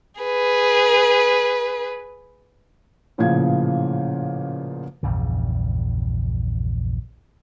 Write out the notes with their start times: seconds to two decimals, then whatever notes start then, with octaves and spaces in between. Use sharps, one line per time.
0.21 G#4 B4
3.18 A1 A#2 C#3 F3 G#6
5.03 A#1 E2 G2 C#3